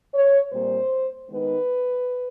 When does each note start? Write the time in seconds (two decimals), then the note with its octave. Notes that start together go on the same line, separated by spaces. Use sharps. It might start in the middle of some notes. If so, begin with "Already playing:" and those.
0.13 C#5
0.52 A#2 G3 C4 C5
1.30 D#3 G#3 B3 D#4 B4